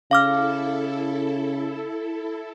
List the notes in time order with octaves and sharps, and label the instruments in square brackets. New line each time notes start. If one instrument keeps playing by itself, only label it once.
[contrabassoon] C#3 [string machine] E4 A4 [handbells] F5 D6 F6